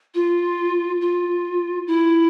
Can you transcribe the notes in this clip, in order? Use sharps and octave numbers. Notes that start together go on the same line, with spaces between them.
F4
F4
E4